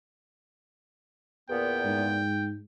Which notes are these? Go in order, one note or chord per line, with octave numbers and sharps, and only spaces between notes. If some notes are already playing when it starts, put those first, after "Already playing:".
E2 A#2 B3 G5
G#2